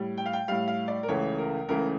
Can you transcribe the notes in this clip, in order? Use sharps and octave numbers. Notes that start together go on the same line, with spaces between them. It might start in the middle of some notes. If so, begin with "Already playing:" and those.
Already playing: A2 G3
G5
F5
G5
A2 G3 F5
F5
D5
A#4
C#2 C#3 E3 A3 C#5
A#4
C#2 C#3 E3 A3 A#4